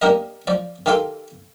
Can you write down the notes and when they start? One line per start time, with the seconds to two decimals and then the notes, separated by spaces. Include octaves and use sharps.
0.02 A#3 D4 G4 A#4 D#5
0.47 F3 D5
0.86 D#3 G4 A4 F5 C6 D6